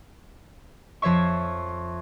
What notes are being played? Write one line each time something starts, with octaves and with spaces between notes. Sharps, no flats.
F2 F3 C#5 E5 C#6